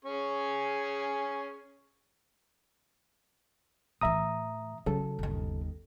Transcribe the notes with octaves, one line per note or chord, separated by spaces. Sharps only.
C#4 G#4 C#6
A2 E3 E5 A#5 D#6
C#3 F#3 A4
G1 D#2